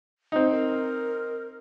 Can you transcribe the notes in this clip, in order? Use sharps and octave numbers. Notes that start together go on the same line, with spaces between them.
C4 D#4
A#4